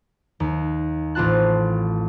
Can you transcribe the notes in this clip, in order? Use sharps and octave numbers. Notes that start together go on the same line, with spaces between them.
D#2
A1 C4 F4 A5 F#6